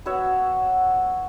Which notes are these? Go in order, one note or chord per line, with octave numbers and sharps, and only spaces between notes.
B3 F#4 C#5 E5